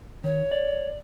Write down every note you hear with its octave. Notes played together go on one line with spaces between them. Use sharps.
D#3 C#5
D5